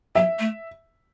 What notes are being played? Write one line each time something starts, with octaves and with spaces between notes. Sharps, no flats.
F#3 E5
A3